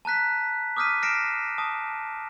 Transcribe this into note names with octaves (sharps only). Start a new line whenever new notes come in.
A5 A#5 F#6 B6
D6 D#6 F6 G6 B6 D#7
F6 A#6 C7 D7 E7
A5 D#6